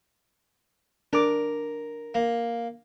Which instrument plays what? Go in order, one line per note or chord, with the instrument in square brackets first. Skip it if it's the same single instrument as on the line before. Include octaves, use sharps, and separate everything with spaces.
[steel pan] D4 D6 [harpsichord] A#4
[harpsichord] A#3